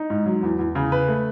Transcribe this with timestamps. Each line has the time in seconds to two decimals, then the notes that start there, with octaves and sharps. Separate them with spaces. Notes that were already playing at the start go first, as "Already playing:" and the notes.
Already playing: D#4
0.10 G#2
0.26 F#3
0.43 E2
0.59 E2
0.75 C#3
0.92 B4
1.08 A3